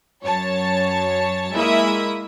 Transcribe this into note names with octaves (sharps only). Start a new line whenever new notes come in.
F#2 C#5 A5
G#3 A#3 E4 E5 B5 D#6